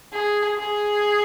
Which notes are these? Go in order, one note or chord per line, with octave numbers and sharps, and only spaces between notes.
G#4
G#4